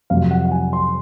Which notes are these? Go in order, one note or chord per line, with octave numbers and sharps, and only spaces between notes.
F2 C3 F#3 F5
F#5
F#5
G#5
C6